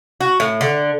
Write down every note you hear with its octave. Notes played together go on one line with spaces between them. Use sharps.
F#4
A2
D3